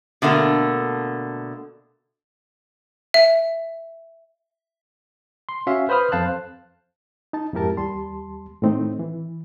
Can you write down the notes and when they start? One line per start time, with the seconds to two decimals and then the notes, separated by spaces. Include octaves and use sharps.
0.22 B2 D3 A3 A#3
3.14 E5
5.49 C6
5.67 C#4 F#4 E5 F5
5.89 B4 C5 B5 D#6 F6
6.12 F2 C5 F5 A5 F#6
7.33 D#4 A5
7.53 F2 G#2 E4 G4 A#4 A5
7.77 D#2 G3 A5 C6
8.62 A2 D#3 A3 C4 D#4
8.99 E3